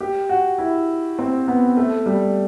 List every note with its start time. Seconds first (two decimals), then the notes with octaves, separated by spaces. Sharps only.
0.01 G4
0.29 F#4
0.58 E4
1.19 C4
1.48 B3
1.77 A3
2.06 G3